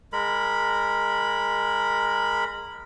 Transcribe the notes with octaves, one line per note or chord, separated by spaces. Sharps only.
G#3 A#4 B5